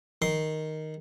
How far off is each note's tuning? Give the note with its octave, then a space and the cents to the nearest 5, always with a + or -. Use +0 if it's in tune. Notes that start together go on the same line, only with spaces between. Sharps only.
D#3 +0 C6 +0